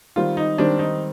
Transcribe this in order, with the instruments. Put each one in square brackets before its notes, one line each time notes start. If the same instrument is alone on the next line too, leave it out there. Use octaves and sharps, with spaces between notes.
[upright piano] D#3 G3 C4 [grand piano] F4
[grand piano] D#4
[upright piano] D#3 G3 C4 [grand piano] D4
[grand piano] D#4